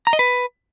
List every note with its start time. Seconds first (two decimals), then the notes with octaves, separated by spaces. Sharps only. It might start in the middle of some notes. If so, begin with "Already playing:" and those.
0.07 A#5
0.13 D#5
0.19 B4